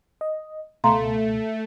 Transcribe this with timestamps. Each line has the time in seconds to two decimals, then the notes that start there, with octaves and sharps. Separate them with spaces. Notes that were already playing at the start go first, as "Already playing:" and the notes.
0.21 D#5
0.84 C#2 B2 A3 F5 A#5 C6